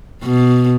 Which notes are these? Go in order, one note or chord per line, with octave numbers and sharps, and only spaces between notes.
B2